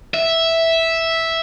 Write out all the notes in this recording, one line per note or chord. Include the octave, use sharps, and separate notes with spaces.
E5